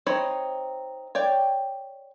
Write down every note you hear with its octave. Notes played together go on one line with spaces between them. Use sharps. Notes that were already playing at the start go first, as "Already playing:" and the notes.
C4 D#4 C#5 B5
C#5 D5 G5